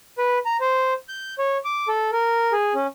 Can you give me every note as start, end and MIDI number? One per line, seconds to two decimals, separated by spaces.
0.18 0.38 71
0.45 0.57 82
0.60 0.94 72
1.09 1.34 91
1.39 1.58 73
1.65 1.88 86
1.88 2.10 69
2.12 2.52 70
2.53 2.74 68
2.74 2.87 61